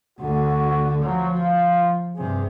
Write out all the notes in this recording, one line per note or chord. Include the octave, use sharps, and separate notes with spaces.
D2 D3 F#4
F3 F#3
F4
G2 C3 G#4